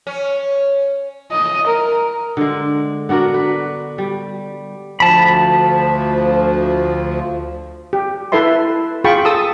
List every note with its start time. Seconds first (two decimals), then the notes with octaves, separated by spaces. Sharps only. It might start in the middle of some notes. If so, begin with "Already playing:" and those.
0.07 C#4
1.32 D#5
1.67 A#4
2.37 D3 G#3
3.09 B3 D4 F#4 A#4
3.34 B4
3.98 G3
5.00 D2 F3 A5 B5
7.93 G4
8.32 E4 A4 B4 E5 C6
9.04 F4 G#4 G5 B5 C#6
9.25 A4 A5 D#6 E6